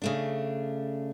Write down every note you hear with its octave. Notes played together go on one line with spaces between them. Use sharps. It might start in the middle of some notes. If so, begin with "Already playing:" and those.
C#3 A3 D4